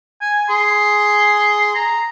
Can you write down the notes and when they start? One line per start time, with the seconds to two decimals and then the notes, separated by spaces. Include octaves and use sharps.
0.21 G#5
0.49 G#4 C6
1.75 A#5